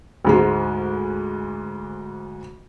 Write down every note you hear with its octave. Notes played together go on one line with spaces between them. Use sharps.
D2 G#2 G#3